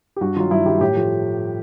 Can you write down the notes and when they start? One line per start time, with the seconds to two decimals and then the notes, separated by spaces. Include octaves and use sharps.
0.16 G4
0.21 G2 F#4
0.36 D#3 F#3 F4
0.51 G2 E4
0.65 D#3 F#3 G4
0.81 A2 G4
0.96 F3 A3